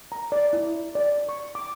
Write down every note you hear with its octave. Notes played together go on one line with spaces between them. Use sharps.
A#5
D5
E4
D5
C#6
D6